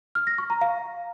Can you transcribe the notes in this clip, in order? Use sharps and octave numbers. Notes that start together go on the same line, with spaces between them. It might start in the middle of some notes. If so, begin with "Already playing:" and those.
F6
A#6
C#6
A#5
F5